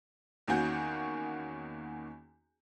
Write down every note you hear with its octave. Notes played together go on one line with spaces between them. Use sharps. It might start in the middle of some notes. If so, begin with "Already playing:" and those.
E2 D#3 A#3 C#4 F#4 G6